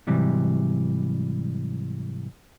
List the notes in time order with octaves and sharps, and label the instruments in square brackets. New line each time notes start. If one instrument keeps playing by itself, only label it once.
[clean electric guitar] G#2 C3 E3 F#3 G3